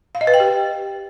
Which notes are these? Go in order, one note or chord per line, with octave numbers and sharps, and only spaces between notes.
F5
D#5
B4
G5
G4